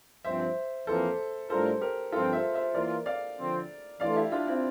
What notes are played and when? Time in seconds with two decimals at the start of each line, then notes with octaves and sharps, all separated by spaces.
0.24 G2 F3 C4 C5 E5
0.86 F2 E3 A#3 A4 C5
1.49 A2 G3 D4 F4 A4 A#4 C5
1.81 G4 A#4
2.12 G2 F3 C4 F4 A4
2.33 C5 E5
2.54 C5 E5
2.74 E3 A#3 F4 A#4 D5
3.06 D5 F5
3.38 D3 F3 C4
4.00 E3 A3 D4 F4 A4 D5 F5
4.16 E4 G4
4.32 D4 F4
4.47 C4 E4